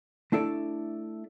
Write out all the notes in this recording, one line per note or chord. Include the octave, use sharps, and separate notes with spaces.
A3 D4 E4 A4 D5